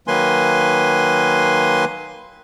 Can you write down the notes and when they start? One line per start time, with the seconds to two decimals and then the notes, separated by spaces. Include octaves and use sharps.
0.08 D#3 F#3 A#3 B4 G#5 C6